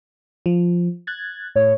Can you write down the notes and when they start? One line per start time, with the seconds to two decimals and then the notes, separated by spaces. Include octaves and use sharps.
0.46 F3
1.07 F#6 G#6 A6
1.56 A2 C#5